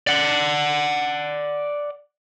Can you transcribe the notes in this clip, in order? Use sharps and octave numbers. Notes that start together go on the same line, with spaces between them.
D5 F#5